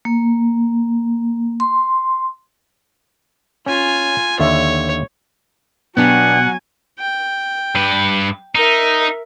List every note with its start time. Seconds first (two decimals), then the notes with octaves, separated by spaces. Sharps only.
0.05 A#3
1.60 C6
3.66 C#4 F4 G#5
4.39 D#2 D3 C#5 E5
5.97 B2 F#3 B3 D4 G4 F#5 G#5
6.99 G5
7.75 G2 B4
8.55 D#4 A#4 E5